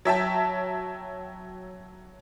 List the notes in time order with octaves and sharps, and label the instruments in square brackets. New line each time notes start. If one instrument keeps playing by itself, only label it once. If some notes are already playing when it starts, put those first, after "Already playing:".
[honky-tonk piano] F#3 E5 G5 A5